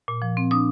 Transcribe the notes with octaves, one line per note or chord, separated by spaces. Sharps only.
A#2
F3
C4
D4 D#6